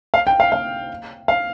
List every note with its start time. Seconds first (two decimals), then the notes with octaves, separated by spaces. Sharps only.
0.14 F5
0.27 G5
0.40 F5
0.52 F5
1.28 F5